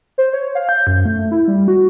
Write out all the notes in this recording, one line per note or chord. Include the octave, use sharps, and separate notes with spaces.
C5
C#5
F5
G6
F#2
A3
E4
G3
F#4